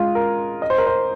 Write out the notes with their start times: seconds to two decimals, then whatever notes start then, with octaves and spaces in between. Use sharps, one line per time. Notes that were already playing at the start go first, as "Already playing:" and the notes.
Already playing: G#3 F4
0.15 A#4
0.62 D#5
0.70 C5
0.78 A#4
0.87 C5